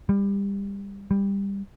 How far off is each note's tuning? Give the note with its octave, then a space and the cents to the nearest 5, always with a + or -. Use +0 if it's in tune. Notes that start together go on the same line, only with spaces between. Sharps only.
G3 +25
G3 +15